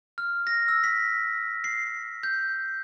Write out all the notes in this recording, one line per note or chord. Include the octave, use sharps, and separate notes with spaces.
F6
A#6
E6
B6
C7
G6